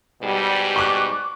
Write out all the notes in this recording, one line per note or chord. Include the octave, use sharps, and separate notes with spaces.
G#2 B2 G3
C#6 D6 F#6